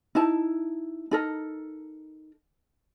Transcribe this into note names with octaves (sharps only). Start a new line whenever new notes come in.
D#4 E4 A5
D#4 A4 A#4